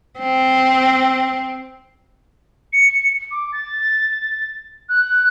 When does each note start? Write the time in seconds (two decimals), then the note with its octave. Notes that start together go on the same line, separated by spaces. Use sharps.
0.20 C4
2.73 C#7
3.31 D6
3.53 A6
4.89 F#6